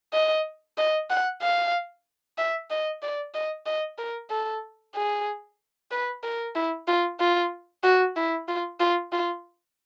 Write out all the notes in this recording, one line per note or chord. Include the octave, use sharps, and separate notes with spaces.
D#5
D#5
F#5
F5
E5
D#5
D5
D#5
D#5
A#4
A4
G#4
B4
A#4
E4
F4
F4
F#4
E4
F4
F4
F4